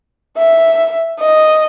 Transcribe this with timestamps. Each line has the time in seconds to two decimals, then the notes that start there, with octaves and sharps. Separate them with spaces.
0.37 E5
1.20 D#5